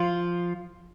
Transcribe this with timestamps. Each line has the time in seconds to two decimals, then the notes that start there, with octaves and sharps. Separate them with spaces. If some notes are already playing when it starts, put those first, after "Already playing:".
Already playing: F3 F4